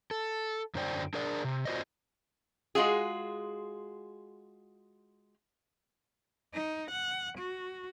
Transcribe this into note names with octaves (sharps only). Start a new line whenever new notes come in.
A4
F#2 D3 F#3 C5 D5 G5
D4 G#4 A#4 D5
C3
F4 F#4 A#4 C5 D5 D#5
G#3 F4 F#4 G#4
D#4
F#5
F#4